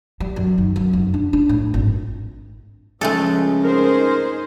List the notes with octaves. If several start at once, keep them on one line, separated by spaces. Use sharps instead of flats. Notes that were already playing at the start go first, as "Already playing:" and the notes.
G3
F#2
D#3
F#2
F1
D4
D4
A2
G#1
C#2 F3 G#3 A3 A4
C4 D#4 G#4 A#4 C5